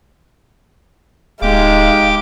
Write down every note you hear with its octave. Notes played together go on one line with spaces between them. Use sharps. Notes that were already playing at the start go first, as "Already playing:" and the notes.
D1 G#3 D#4 G4 F5 D6